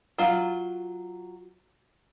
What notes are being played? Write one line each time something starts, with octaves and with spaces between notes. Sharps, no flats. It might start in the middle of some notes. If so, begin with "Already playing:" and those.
F#3 F4